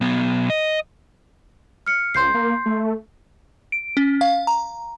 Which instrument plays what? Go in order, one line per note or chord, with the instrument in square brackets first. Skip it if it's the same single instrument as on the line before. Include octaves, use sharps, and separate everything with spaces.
[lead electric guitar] B1 B3
D#5
[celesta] F6 C#7
[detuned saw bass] C#2 [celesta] C6 G6 C7
[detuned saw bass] A#3
A3
[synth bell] D7
C#4
F5
A#5